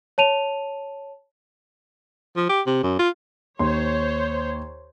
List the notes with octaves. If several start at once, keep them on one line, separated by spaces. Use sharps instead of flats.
C#5 A5 D#7 F7
F3
G4
C3
F#2
F4
D#2 C5 C#5 C6